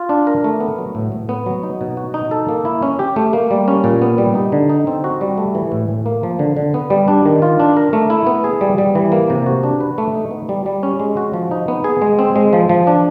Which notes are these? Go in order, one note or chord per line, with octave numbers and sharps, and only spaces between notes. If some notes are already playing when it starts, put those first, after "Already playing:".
Already playing: F4
D4
A#4
A3
B3
F#3
A2
A2
B3
F#3
D#4
B2
F#4
D#4
A4
A#3
E4
C#4
G4
A3
A#3
G3
C#4
A#2
B3
G3
D#4
D3
D#4
C4
F#4
G3
A3
E3
A2
A2
A#3
F3
D3
D3
B3
G3
D4
D#3
F4
D4
A#4
A3
E4
B3
G#4
G3
G3
E3
A#3
C3
F#4
D4
B4
A3
D#4
B3
G3
G3
C#4
G#3
F#4
F3
D#4
B3
G#4
G#3
C4
G#3
F3
F3
D4